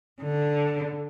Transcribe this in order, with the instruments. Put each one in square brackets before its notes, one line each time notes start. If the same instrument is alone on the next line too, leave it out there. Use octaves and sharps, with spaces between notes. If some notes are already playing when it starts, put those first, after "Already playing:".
[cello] D3